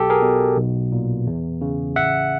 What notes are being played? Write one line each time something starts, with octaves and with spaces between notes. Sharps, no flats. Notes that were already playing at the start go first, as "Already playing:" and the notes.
Already playing: B1 B2 G4 A4
G#4 A#4
B2
B1
A#2
E2
C#3
A1 E5 F#5